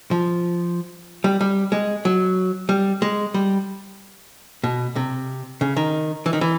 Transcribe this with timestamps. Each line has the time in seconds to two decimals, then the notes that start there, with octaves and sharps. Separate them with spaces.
0.11 F3
1.24 G3
1.41 G3
1.72 G#3
2.05 F#3
2.69 G3
3.02 G#3
3.34 G3
4.64 B2
4.96 C3
5.61 C#3
5.77 D#3
6.26 E3
6.33 D#3
6.41 E3